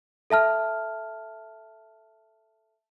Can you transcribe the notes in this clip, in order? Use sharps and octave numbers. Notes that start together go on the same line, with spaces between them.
A4 E5 A5 F6